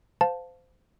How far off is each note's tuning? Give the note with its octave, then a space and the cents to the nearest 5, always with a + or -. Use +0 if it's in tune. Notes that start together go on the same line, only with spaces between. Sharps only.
C5 -25 F5 +15 A5 +0